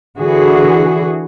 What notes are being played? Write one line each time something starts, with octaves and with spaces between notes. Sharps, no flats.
D3 E3 F#4 G#4